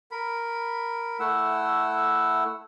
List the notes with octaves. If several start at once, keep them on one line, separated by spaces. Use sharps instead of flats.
A#4 B5
A3 E4 F#5 E6